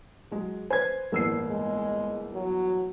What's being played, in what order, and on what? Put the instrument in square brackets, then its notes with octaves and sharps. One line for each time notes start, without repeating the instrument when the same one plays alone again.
[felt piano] F#3 G#3
[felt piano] B4 G#5 [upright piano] C5 G#6
[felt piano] G1 E2 A2 [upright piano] A#3 E6 C7
[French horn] G#3
F#3